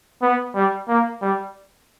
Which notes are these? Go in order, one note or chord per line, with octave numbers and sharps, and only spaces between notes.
B3
G3
A#3
G3